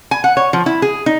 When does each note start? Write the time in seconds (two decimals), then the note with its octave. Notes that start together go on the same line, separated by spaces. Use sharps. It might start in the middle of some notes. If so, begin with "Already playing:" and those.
0.11 G#5
0.24 F#5
0.37 C#5
0.53 F3
0.66 E4
0.82 G#4
1.06 D#4